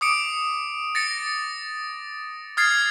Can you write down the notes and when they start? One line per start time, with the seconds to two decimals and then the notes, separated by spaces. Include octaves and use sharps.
0.01 D6 D#6 C#7 D7
0.95 A6 A#6 C#7
2.57 D#6 F6 G#6 A6 C7